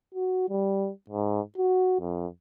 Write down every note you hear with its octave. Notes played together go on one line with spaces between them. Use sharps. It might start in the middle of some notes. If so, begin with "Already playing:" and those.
F#4
G3
G#2
F#4
F2